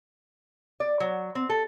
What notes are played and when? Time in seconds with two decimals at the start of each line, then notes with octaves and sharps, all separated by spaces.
0.80 D5
1.00 F#3
1.35 C4
1.49 A4